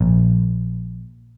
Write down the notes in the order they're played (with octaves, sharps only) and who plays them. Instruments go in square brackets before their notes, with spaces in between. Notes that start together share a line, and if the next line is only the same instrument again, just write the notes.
[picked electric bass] A#1